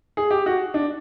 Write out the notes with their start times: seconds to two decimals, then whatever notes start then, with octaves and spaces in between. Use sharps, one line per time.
0.17 G#4
0.31 G4
0.46 F#4
0.74 D4